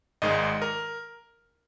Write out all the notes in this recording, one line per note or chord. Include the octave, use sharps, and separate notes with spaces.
G#1 G#2 D#3 G#3 D#5
A#4